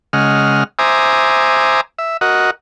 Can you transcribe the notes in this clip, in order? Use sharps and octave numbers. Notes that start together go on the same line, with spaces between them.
C#3 G#3 D#5 F#5 F6
C5 E5 G#5 A#5 D6 D#6
E5
F#4 A#4 D#5 F#5